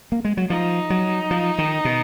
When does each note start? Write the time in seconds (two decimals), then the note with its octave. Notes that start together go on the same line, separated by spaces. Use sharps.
0.12 A#3
0.25 G#3
0.37 F#3
0.50 F3 D#4
0.90 F#3
1.31 F3
1.58 D#3
1.85 B2